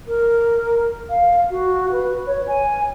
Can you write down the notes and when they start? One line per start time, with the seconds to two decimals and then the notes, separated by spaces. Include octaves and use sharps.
0.07 A#4
1.09 F5
1.50 F#4
1.91 B4
2.26 C#5
2.47 G#5